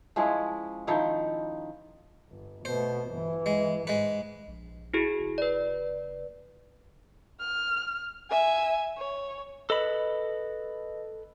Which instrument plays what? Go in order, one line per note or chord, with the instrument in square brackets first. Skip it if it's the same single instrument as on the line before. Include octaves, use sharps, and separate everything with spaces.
[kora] F3 G#3 C#4 E4
D#3 F3 D#4 E4
[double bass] G1
[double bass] B2 A3 [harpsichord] C5
[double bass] G1 E3
[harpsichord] G#3
[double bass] G#2 [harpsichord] G#3 B4
[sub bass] A#1
[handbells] E4 F#4 G#4
[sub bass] F#1
[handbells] B4 D5
[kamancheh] F6
E5 G#5
C#5
[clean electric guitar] A4 B5 [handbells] B4 D#5